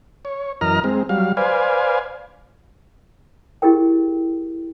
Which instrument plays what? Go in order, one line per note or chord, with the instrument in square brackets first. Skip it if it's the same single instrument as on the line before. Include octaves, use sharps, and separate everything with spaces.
[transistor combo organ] C#5
F#2 E3 A#4 D#5 A#5 F6
G#3 C4
F#3 G3 F5
B4 C5 D5 F5 G#5
[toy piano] E4 G4 G#4 A#4 G5